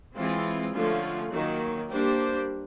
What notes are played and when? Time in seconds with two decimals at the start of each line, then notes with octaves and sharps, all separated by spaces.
0.17 E3 G#3 C4 F4
0.74 D3 F3 A3 C#4 F4
1.32 D#3 F#3 A#3
1.90 G3 A#3 D4 G4 C5